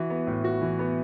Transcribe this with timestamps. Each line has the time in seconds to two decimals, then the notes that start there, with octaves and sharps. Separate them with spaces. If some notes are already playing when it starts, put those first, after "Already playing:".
Already playing: E3 F#4
0.10 B3
0.27 A2
0.44 F#4
0.62 E3
0.79 B3